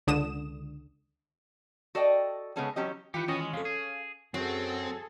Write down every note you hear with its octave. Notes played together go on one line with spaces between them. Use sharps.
C#2 D3 D#6 E7
F#4 A4 D5 D#5 G5
C#3 G#3 B3 C#4 G#4 A4
E3 F#3 C#4 G4 D#5
D#3 E3 F4 G4 B4 G5 C#7
B3 C#4 F#4 D#5
G#3
F2 C#3 G#3 A4 F5
G#4
F#2 F#3 C4 G#4 A4